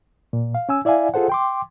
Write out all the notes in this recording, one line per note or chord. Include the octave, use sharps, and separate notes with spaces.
A#2
F5
C#4 G#5 E6
E4 D5 E5 F5 G#5
F4 G#4 A4 C5 F#5
G5 C6 D6